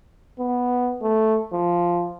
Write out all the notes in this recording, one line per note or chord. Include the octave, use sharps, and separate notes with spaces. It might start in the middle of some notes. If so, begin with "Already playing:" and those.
B3
A3
F3